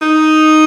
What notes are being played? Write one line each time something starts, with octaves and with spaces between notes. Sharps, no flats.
D#4